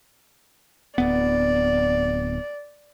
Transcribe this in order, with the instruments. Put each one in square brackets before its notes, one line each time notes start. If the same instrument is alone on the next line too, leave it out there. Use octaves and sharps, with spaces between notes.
[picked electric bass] D1 B3 [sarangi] D5